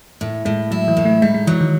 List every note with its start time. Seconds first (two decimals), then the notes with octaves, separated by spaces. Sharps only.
0.21 A2
0.45 A2 G#3
0.71 F#3 E4
0.88 E3
0.97 A2
1.05 A3
1.22 G#3 D#4
1.34 G#3
1.47 E3 F#3
1.61 D#3